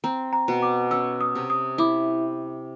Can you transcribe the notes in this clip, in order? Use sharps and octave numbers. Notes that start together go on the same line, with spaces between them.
C4 A#5
A#5
B2
D6
C#4 E6
D#6
C3
D#6
E4 D6